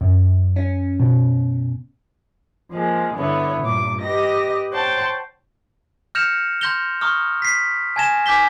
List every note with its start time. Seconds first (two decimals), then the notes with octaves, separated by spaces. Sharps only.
0.01 F#2
0.56 C#4
1.00 B2
2.72 F3 G#3 A#3
3.14 G2 D3 B3 E4 C#5
3.61 G2 A#2 D6
4.01 G4 B4 D#5 A#6
4.73 C5 C#5 F#5 G5 A5 C6
6.15 F6 G6 A#6 C#7 E7 F7
6.61 C6 F6 G6 A#6 F7 G7
7.01 A#5 C#6 D#6 F6
7.42 B6 C7
7.96 G#5 A5 G#6 A#6 E7 G7
8.26 G#5 D6 G6 B6 G7